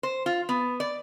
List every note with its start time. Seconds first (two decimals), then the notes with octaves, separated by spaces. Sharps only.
0.03 C5
0.26 F4
0.49 B3
0.80 D5